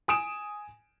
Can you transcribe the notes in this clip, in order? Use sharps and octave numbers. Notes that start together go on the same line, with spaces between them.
G#5 D#6 D7 E7